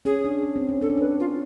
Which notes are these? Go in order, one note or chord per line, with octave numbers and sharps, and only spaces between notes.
C#4 G#4
D4
C#4
C4
C#4
D4 A4
C#4
D4 B4
F4